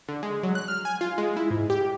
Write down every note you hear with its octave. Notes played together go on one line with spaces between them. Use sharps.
D3
G#3
F#3
F#6
F6
G#5
F4
G#3
E4
G#2
G4